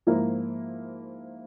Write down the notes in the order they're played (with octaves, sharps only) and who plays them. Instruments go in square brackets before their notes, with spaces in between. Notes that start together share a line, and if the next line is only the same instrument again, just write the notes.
[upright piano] G#2 F3 A#3 E4 A#4